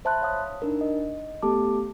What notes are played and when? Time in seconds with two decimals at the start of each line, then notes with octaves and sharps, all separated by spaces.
0.05 C5 E5 A5 B5 C6 F#6
0.22 C#5 F5 D#6
0.62 D4 D#4 A#4
0.81 D#5
1.42 A3 B3 G4 A4 A5 D6